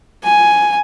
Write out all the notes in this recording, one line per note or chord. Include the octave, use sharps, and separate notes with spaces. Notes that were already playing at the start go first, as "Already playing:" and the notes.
G#5